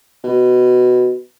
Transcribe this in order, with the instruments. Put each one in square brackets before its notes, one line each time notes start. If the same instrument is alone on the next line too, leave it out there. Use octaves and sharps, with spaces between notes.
[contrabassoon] B2